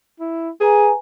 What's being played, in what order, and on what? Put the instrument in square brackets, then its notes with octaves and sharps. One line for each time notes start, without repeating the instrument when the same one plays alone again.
[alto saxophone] E4
[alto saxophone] G#4 [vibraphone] B4 G#5 A#5